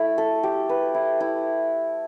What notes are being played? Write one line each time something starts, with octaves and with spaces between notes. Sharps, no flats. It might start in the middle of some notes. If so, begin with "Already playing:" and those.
Already playing: A3 E4
A4
G4
B4
E4
E4